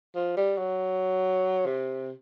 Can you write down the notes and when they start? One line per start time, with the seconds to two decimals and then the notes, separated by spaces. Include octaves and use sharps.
0.15 F3
0.37 G3
0.58 F#3
1.66 C3